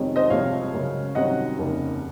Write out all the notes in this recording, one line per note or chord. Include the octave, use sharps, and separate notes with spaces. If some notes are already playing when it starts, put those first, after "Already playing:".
Already playing: F2 C3 D#3 G#3 C#4
C5 D#5
C2 C3 F3 G#3 C4 C#5 F5
F#2 C#3 G#3 C#4
C2 C3 D#3 F#3 C#4 D#5 F#5
F1 D#2 C#3